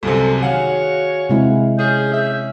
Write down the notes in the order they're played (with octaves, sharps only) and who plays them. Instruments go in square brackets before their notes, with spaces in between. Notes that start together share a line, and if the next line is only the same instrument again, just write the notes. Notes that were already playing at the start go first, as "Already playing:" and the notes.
[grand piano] C2 F#2 C3 [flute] A4
[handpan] D#3 [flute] F#4 [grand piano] G#4 F5 F#5 [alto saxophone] C#5
[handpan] C3 G#3 E4
[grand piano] C#4 [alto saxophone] G#4 [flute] G6
[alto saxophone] E5